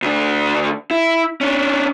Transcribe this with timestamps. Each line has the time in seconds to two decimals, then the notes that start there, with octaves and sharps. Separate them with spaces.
0.02 D2 D4
0.91 E4
1.41 C#4 D4